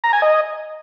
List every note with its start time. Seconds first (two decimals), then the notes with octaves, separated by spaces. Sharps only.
0.04 A#5
0.13 G#5
0.22 D#5